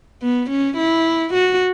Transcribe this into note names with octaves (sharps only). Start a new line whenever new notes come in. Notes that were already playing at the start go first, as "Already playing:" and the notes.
B3
C#4
E4
F#4